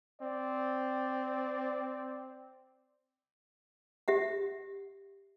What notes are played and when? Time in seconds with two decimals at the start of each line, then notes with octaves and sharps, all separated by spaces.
0.21 C4 D5
4.08 G4 E5 F#5